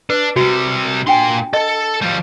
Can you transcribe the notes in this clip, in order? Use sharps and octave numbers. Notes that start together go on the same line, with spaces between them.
D4 B4
C3 G3 F#4
A#2 D4 G5 G#5 C6
A4 D#5
F3 G3